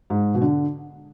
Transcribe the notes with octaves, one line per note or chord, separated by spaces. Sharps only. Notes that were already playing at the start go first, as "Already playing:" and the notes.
G#2
B2
D3